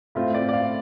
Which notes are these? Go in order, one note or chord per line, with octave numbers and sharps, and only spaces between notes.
A2 A3 C4 F4
D5
D5
F5